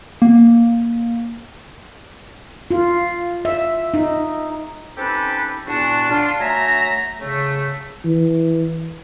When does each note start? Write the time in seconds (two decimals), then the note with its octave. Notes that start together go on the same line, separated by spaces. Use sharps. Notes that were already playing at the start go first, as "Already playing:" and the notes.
0.22 A#3
2.71 F4
3.45 E5
3.94 D#4
4.97 C4 C#4 D#4 G4 A4 B4
5.67 E2 A#2 D4 F#4 F#5 A5
6.10 D4 F4
6.40 F#3 A3 E5 G#5 A#5
7.21 C#3 A3
8.04 E3